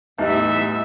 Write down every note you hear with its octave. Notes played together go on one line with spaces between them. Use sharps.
E2 A2 G3 D#4 E4 G4 D#5 E5